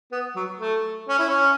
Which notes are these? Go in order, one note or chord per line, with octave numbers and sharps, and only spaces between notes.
B3
F#3
A3
C#4
E4
C#4